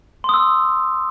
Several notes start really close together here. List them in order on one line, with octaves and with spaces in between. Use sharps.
C6 D#6 E6